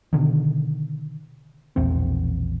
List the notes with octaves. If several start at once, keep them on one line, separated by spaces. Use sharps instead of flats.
B2 D3 D#3
E1 A#1 E2 C4